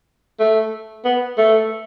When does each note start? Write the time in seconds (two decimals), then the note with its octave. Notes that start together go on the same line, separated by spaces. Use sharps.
0.39 A3
1.05 B3
1.38 A3